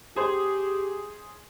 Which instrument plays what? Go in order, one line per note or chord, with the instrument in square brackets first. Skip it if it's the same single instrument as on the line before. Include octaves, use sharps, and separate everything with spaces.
[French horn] G4 [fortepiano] G#4 C5